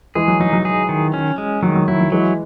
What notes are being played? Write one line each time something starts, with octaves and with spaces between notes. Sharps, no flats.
E3 G#3 G#4
F#3
F#3 D#4
F#3
G#4
D#3
C#4
G#3
D#3 F#3
F#3
F#3 E4
F#3
E3 F#3 G#3